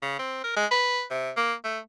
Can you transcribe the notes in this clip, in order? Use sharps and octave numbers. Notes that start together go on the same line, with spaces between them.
C#3
C4
A#4
G#3
B4
C3
A#3
A3